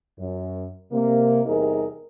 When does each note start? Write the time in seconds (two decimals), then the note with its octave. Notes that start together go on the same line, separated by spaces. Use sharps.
0.19 F#2
0.92 C3 A#3
1.46 E2 C3 G3 D#4 G#4 A#4